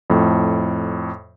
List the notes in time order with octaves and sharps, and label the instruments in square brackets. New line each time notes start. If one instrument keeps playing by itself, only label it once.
[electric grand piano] F2 A2